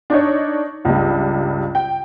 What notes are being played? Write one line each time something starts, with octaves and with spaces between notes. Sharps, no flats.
D4 D#4 C#5
C#2 G2
G5